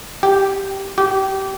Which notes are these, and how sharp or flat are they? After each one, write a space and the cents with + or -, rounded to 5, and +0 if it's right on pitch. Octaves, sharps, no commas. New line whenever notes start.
G4 -5
G4 -25